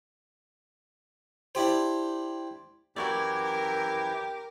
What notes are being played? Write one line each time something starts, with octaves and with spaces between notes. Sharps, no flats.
D4 E4 G4 C5
F#2 E3 E4 F#4 G4 A#4 C#5 D5